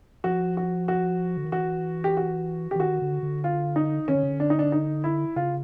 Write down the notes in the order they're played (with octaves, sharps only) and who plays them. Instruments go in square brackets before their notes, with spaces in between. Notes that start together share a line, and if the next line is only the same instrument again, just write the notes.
[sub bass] F3 [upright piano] F#4
[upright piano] F#4
F#4
[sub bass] D3
D#3
[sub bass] E3 [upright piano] F#4
[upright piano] G4
F#4
G4
[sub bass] E3
[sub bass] D#3 [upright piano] F#4
[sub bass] D3
D3
[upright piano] F4
D#4
[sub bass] D#3 [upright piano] C#4
[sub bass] D3
C#3
D3
[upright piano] D4
D#4
D4
D#4
E4
[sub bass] C#3 [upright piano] F4